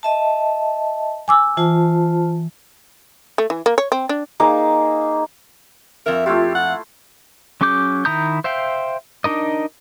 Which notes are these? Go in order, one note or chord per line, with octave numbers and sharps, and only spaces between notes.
D#5 E5 A5
G#5 D6 E6
E3 F4 C5 A5
A3
E3
A#3
C#5
C4
D4
A#3 D#4 G#4 F5
F2 A#4 E5
A3 E4 F4 G4
F#5
F#3 C#4 G#4 D6 G6
D#3 E4 A#5 D#6 G6
C5 E5 F5 G5
D4 D#4 A#4 D#5